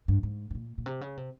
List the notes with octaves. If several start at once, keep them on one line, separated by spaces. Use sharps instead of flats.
G2
G#2
G#2
A#2
A#2
C3
C#3
C3